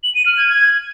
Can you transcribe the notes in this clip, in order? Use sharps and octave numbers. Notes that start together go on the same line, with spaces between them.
F#7
D#7
F6
G#6
G#6